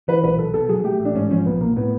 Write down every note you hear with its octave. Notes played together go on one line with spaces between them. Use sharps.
E3 B4
B1 B4
B1 A4
B2 A4
F#3 G#4
A3 G4
A1
D4
G#2 C#4
F3 C#4
B1 B3
B1 A#3
A2 B3